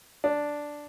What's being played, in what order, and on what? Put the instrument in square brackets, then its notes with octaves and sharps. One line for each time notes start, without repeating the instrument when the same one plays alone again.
[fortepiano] D4